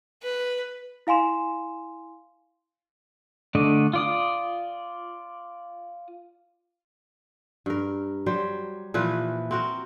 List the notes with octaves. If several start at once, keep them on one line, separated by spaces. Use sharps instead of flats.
B4
E4 F5 G#5 C6 E7
D3 A3 D4 D#5
F4 D5 D#6
G2 A#4
F#3 G3 C5
A#2 E3 F3 B4
C4 F#4 A#4